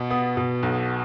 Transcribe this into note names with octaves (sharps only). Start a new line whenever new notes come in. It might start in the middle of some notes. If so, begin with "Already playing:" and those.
Already playing: B2 B3
B3 D#6
B2
B1